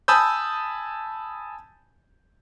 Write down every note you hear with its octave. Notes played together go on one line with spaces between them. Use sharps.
G#5 A5 B5 D#6 E6 G6